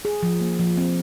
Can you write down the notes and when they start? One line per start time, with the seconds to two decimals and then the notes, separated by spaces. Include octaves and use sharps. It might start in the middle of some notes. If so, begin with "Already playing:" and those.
0.05 G#4
0.23 F3
0.41 A#3
0.59 F3
0.77 C4